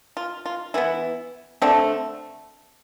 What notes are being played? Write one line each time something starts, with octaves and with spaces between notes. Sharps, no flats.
F4
F4
E3 B3 E4
D3 A3 C4 D4